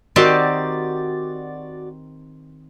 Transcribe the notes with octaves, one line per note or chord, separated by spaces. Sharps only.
D#3 C4 F#4 G4 D5 A6